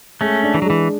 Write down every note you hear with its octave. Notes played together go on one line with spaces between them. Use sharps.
G#3 A3 C#4
D4
E3
F#3
E3 G#3